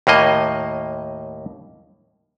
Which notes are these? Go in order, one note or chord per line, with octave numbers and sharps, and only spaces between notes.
D#2 A2 A#3 D#5